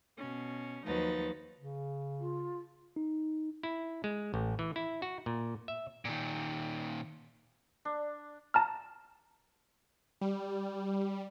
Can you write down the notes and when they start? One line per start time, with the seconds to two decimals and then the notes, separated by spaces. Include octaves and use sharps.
0.17 B2 C#4
0.84 D#2 F3 F#3 D#4 B4 A6
1.60 C#3
2.19 F4
2.96 D#4
3.63 E4
4.04 G#3
4.34 A1
4.59 E3
4.76 E4
5.02 F#4
5.26 A#2
5.68 E5
6.05 A#2 D#3
7.85 D4
8.54 A5 A#5 F6
10.21 G3